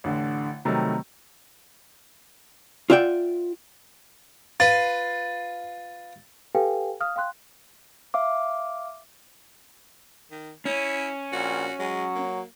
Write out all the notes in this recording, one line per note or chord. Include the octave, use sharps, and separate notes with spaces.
A1 D3
C3 D#3 F#3 G3 A3 C4
F4 D5 E5 F#5 G5
F4 B4 A6
G4 A4 B4 F5 G5 G#5
F5 D#6 F6
F5 G5 C6 F#6
E5 F5 D6
D#3
C#4 E4
A#1 F#4
F#3 G#3
A#3